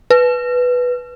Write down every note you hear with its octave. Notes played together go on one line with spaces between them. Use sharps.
B4